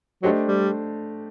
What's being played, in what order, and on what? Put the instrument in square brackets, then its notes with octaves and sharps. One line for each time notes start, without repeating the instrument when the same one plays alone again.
[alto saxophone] F#3 [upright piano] A3 D4 G4 C5 D#5
[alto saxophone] G3